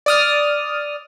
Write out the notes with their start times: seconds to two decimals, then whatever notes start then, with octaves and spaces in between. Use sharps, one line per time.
0.06 D5 D#6 F6